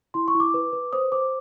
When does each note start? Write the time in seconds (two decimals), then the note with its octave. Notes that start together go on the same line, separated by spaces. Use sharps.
0.14 E4 C6
0.28 C#6
0.35 E4
0.40 D6
0.54 B4
0.73 B4
0.93 C5 D#6
1.12 C5 D6